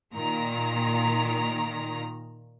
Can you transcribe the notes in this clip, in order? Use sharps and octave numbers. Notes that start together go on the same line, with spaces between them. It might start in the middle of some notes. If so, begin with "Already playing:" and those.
A#2 D#3 A#5